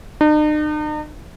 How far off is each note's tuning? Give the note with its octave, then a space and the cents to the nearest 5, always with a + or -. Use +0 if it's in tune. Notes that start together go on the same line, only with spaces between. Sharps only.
D#4 -45